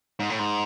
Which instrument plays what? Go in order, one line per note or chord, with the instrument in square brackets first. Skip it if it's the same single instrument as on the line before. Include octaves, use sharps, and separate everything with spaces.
[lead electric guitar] G#2
A2
G#2